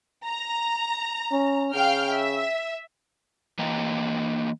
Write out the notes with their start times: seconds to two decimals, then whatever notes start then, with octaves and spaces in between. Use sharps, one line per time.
0.26 A#5
1.32 C#4
1.74 C#3 F5 G5 F6
2.11 E5
3.59 E3 A#3 D#5 G5 A#5